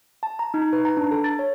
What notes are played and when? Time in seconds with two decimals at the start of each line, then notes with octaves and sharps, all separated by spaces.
0.23 A5
0.39 A#5
0.54 D#4
0.73 B4
0.85 A#5
0.97 D4
1.11 A4
1.24 A6
1.39 C#5